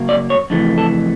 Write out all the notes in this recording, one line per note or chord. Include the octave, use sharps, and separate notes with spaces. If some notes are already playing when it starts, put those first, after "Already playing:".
Already playing: F#2 C#3 F#3 A#3
D5
C#5
F2 C#3 E3 A3
A4